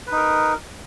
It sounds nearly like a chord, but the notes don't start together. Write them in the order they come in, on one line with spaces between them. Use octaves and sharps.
B4 D#4 A#4